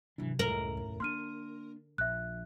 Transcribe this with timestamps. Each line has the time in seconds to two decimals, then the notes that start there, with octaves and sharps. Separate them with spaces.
0.18 G#1 C3 E3 F#3 D4
0.39 F#1 C#2 A2 C#3 A#4 F#7
0.77 D#2
1.00 D3 A#3 D4 C6 F6 D#7
1.98 A#1 E5 F#6